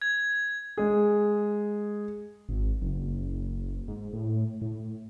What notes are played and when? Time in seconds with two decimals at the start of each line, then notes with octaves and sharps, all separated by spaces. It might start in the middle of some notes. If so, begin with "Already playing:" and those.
0.02 G#6
0.77 G#3 G#4
2.49 G#1
2.82 F#1
3.88 G#2
4.13 A2
4.62 A2